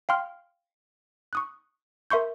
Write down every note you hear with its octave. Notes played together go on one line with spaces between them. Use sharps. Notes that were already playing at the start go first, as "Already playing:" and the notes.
F5 G5 C6 F6
C#6 D#6 F#6
A#4 E5 C6 C#6 G6